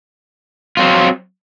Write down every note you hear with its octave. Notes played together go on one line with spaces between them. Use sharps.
F#3 C4 F4